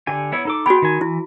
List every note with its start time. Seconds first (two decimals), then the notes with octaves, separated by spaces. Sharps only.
0.07 D3 G4 G#5
0.32 B3 E4 C#5
0.45 D#4 A4 D6
0.66 B3 F#4 G#4 G5 B5
0.82 D#3 G#5
1.01 E3 E4